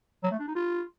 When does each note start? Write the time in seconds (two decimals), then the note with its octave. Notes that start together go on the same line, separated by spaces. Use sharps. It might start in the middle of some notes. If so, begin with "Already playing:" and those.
0.23 F#3
0.31 A3
0.39 D4
0.47 D#4
0.55 F4